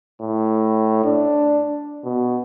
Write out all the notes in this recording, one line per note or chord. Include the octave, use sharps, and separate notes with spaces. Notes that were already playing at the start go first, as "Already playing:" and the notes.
A2
D4
B2